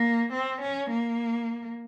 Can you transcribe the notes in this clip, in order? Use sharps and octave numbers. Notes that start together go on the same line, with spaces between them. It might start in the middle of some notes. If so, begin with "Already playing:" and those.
Already playing: A#3
C4
C#4
A#3